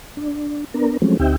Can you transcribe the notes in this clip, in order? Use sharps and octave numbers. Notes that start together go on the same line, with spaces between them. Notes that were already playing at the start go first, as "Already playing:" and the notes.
D4
B3 D4 A#4
F3 F#3 G#3 A3 C4 C#4
D2 C4 D#4 G4 E5 G5